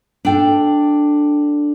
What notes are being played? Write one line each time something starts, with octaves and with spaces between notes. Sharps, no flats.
D4 A4 G5